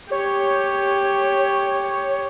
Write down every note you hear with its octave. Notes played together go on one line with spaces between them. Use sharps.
G4 C#5